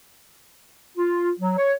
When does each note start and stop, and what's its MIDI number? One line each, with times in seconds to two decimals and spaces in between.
0.98 1.31 65
1.40 1.55 54
1.58 1.73 73